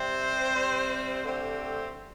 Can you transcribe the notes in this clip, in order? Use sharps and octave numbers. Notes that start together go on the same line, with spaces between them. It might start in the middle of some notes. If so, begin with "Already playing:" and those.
Already playing: C3 G3 C4 C5
C3 G3 C4
D3 A3 C4 G4